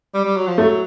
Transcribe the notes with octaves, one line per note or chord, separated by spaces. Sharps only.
G3
G3
F#3
F3
F#3 A3